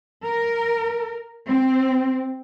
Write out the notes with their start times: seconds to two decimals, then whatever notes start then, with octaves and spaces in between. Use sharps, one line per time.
0.25 A#4
1.47 C4